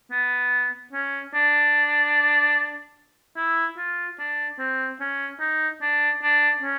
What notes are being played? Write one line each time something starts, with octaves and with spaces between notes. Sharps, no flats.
B3
C#4
D4
E4
F4
D4
C4
C#4
D#4
D4
D4
C#4